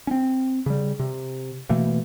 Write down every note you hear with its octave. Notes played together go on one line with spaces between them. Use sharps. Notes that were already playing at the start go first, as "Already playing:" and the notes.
C4 C#4
C#3 G3
C3
B2 E3 A3 A#3